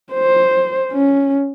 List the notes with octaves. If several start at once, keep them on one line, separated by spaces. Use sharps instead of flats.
C5
C#4